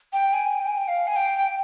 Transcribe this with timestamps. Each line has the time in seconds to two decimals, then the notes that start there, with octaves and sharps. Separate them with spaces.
0.13 G5
0.33 G#5
0.62 G5
0.69 G#5
0.78 G5
0.88 F5
1.07 G#5
1.16 G5